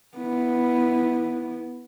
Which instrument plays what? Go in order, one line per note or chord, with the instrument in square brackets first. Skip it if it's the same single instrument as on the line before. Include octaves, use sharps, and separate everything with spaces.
[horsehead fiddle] B3 E4